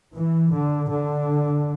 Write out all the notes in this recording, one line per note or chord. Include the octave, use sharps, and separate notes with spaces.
E3
D3
D3